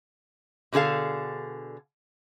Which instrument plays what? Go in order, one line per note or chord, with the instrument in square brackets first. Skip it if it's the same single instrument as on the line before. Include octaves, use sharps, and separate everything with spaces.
[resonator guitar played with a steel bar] B2 D3 G#4 A4 F5